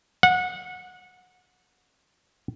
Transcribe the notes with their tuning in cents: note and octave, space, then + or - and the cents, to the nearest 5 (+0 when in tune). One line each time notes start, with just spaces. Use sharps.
F#5 -25